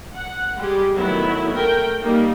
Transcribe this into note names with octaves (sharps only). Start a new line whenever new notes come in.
F#5
G3 G#3 G4 G#4
D#3 F#3 A3 B3 E4
A3 A#4 G5
G3 A#3 D#4